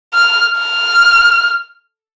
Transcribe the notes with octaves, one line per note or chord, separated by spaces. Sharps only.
F6
F6